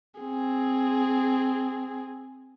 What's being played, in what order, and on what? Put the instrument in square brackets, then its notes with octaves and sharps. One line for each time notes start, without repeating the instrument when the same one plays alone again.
[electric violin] C4 G#4